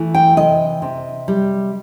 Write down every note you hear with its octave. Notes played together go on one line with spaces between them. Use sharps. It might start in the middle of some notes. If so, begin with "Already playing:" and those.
Already playing: E3 A3
G5
C3 D#5
C3
G3